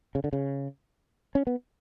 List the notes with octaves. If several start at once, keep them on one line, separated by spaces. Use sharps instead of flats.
C#3
D3
C#3
C#4
B3